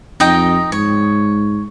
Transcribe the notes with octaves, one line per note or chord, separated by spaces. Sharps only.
F2 D#4 D#5 G5
G#2 C#5